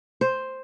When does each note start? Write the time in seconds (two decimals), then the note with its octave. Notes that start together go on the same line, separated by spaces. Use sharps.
0.21 C5